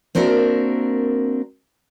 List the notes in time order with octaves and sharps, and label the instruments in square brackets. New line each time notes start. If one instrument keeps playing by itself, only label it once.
[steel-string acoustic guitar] A#3 C4 D4 F#4 A#4 E5